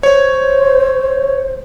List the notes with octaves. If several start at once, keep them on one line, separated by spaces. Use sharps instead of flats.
C5 C#5